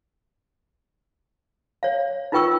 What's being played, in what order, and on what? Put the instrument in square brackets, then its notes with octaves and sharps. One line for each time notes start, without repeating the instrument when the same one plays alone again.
[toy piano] C#5 F5
D#4 F4 B4 G5 C#6 E6